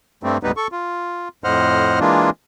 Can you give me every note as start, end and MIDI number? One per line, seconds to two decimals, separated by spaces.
0.23 0.37 43
0.23 0.37 55
0.23 0.37 57
0.23 0.37 60
0.43 0.51 38
0.43 0.51 44
0.43 0.51 55
0.43 0.51 59
0.43 0.51 63
0.43 0.51 71
0.57 0.67 69
0.57 0.67 85
0.72 1.28 65
1.44 1.99 41
1.44 1.99 45
1.44 1.99 72
1.44 1.99 75
1.44 1.99 78
1.44 1.99 89
2.00 2.30 52
2.00 2.30 56
2.00 2.30 58
2.00 2.30 62
2.00 2.30 65